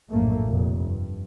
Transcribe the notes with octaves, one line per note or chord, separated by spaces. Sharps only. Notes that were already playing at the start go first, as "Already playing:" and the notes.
A#1 F#2 A2 A3 A#3
F1 A#2
G2